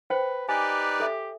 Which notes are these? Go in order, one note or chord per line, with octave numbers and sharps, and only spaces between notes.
B4 C5 G5
D#4 G4 B4 D5 G#5
A4 E5